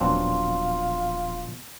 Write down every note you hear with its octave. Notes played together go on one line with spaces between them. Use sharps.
D#1 A#2 F3 F#3 B3 C4 D4 F4